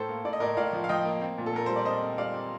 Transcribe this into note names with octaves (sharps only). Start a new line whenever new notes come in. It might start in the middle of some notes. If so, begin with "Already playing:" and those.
Already playing: A2 A4 C5
A#3
A2 D5
D#5
A2 A#4 D5
A2 D5 F5
F3
F5
F3 D#5 G5
A#3
C4
A#2
A4
A#2 A#4
G3 C5
D5
C4 C5 D#5
C4
G3 D5 F5
C4